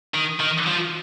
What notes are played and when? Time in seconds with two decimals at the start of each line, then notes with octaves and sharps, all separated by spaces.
0.14 D#3
0.40 D#3
0.66 F3